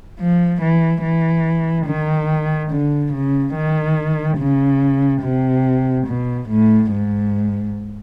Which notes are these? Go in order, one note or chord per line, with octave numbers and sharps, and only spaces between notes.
F3
E3
E3
D#3
D3
C#3
D#3
C#3
C3
B2
A2
G#2